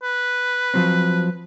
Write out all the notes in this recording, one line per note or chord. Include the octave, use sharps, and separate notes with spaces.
B4
F3 F#3 C4